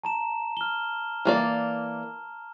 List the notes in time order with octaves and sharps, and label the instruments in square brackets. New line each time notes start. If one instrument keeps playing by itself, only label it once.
[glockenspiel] A5 A#5 E7
F6 G7
[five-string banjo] E3 A#3 D5